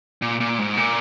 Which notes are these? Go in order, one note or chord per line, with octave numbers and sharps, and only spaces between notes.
A#2
A#2
G#2
A#2